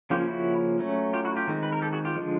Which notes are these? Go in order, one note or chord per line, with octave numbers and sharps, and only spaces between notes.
C#3 F3 A#3 C#4 F4 G4
E4 F#4
F#3 A3 C#4
F4 G4
E4 F#4
F4 G4
D#3 G#3 C4
B4
A#4
G4 A4
F#4 G#4
F4 G4
D3 F3 G#3